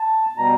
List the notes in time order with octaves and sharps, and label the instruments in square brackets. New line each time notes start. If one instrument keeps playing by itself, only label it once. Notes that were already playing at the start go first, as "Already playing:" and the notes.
Already playing: [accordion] A5
B2 G3 A#5